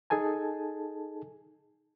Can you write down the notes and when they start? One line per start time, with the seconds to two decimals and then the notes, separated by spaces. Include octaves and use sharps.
0.10 D#4 G#4 A4 G#5 A5